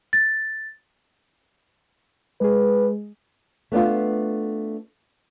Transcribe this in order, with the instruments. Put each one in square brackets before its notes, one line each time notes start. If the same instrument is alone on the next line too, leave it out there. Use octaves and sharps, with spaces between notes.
[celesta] A6
[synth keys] G#3 G#4 [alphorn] B4
[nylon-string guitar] A3 B3 D4 F4